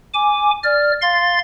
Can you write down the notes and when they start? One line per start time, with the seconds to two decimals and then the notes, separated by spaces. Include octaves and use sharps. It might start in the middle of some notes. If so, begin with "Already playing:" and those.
0.14 G#5 D6
0.64 D5 F6
1.02 F5 C6 A6